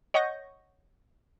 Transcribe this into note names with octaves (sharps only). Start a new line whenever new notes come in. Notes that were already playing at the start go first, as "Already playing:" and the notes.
C#5 D#5 F#5 C#6 G6 A#6